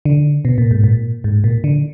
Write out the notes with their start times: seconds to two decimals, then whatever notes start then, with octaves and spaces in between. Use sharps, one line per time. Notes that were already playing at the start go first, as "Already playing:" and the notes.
0.05 D3
0.45 B2
0.58 A#2
0.71 G#2
0.84 A#2
1.24 G#2
1.44 A#2
1.64 D3